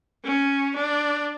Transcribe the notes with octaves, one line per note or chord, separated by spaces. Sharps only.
C#4
D4